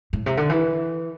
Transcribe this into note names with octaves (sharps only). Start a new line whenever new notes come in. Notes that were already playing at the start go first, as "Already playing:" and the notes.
A2
C3
D3
E3